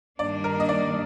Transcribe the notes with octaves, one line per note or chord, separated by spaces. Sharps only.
G2 D#3 A#3 D4 D5
A#4
D#5
D5